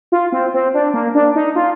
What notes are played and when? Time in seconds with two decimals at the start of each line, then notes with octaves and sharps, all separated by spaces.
0.12 F4
0.32 C4
0.54 C4
0.74 D4
0.94 A#3
1.15 D4
1.35 D#4
1.56 F4